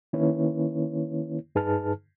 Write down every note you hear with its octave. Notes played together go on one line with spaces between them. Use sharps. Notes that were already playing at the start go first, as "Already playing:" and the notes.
D#3 A#3 C#4 E4 B4 C#5
G2 D#4 G#4 B4 A5 F6